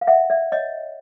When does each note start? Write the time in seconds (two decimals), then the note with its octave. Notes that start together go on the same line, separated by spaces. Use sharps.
0.01 F5
0.07 E5 F#5
0.30 D5 E5
0.52 C#5 D#5